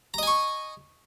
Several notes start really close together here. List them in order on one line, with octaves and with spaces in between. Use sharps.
A#5 D#5 G#5 C#6